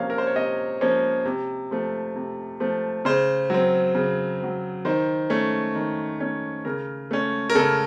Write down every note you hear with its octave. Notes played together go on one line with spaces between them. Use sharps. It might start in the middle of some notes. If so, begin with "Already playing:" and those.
Already playing: C3 F3 A#3 C#4 F5
A#4
C5
C#5
C3 D#5
F3 A#3 C#4
C3
F3 A3
C3
F3 A3
C#3 C5
F#3 C4
C#3
F#3 C4
D#3 C5
A3 C#4
D#3
A3 C#4
C#3 A#4
A3 C#4
A#4
C#3 A4